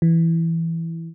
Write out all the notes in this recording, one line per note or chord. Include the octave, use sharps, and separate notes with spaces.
E3